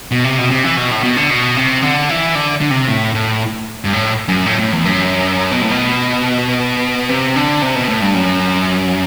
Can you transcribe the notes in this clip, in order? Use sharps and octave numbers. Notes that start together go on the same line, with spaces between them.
B2
C3
B2
C3
E3
B2
A2
B2
D3
B2
C3
D3
E3
D3
D3
C3
A2
A2
G2
A2
F#2
A2
A2
E2
F#2
B2
A2
B2
C3
D3
C3
B2
A2
G2
F#2